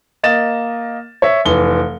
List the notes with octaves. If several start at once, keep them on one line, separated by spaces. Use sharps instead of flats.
A#3 D#5 A6 E7
C#5 E5
F1 E3 G7